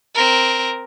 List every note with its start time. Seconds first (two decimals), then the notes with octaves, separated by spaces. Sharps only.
0.15 C4 A#4